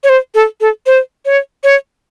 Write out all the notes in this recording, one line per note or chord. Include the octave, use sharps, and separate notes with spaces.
C#5
C5
A4
A4
C5
C#5
C#5